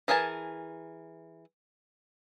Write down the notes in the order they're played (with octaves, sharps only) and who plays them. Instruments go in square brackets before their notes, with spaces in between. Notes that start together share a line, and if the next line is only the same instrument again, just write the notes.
[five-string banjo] E3 G#4 A#4 G#5 A5